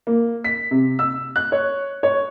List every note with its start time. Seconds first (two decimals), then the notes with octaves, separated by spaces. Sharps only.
0.07 A#3
0.44 B6
0.71 C3
0.99 E6
1.36 F#6
1.52 C#5
2.03 C#5